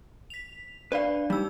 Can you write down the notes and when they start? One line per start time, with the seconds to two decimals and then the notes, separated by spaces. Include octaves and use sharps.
0.30 B6 F7
0.92 D4 B4 D5 F5
1.30 G3 D#4 E6